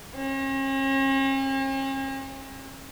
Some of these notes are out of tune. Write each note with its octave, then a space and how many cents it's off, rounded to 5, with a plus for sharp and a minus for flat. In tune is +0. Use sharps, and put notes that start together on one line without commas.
C#4 -45